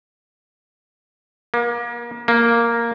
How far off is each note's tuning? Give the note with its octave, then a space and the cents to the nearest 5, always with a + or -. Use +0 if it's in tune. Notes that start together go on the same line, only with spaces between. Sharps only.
A#3 +35
A#3 +0